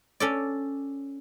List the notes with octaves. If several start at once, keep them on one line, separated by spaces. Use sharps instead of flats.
C#4 A4 D5